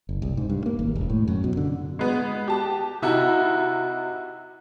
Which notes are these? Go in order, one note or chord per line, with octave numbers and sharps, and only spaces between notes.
F#1
C2
G#2
G2
A#3
G#1
E1
A2
F#2
B2
D3
G#3 B3
G4 A5
C3 D#4 E4 F#4